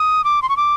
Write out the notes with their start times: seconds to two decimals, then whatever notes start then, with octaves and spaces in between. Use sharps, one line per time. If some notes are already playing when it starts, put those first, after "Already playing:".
Already playing: D#6
0.24 D6
0.42 C6
0.49 C#6
0.57 D6